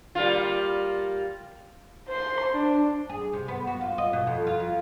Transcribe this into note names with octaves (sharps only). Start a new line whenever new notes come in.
G3 A#3 F4
C5 C6
D4
G#4
C3
B3
F#4
F4
D#5
B2
F2
F4
F2